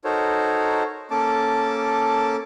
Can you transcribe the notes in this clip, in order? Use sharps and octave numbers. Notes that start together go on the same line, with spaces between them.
D#4 F#4 A4 A#4 C5 C#5
A#3 C#4 A4 A5 D6